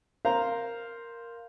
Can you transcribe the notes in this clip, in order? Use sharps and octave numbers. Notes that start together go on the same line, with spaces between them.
A#4 C5 F5 A#5